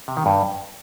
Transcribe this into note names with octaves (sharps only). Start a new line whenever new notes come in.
C3
D#3
G2